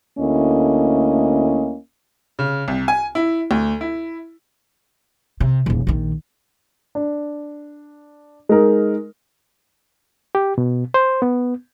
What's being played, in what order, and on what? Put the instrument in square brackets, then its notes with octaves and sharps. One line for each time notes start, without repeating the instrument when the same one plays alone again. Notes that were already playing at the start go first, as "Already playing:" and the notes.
[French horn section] D2 A3 A#3 C#4 E4 D#5
[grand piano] C#3
C2
G#5
E4
D2
E4
[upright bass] C3
D#1 E2
A#1 D#3
[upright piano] D4
G#3 D#4 A#4
[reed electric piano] G4
B2
C5
B3